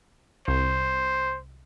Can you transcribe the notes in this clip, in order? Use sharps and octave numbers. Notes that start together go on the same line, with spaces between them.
C2 C5